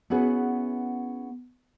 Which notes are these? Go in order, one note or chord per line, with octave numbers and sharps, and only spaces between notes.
B3 C#4 E4 F#4 G#4 B4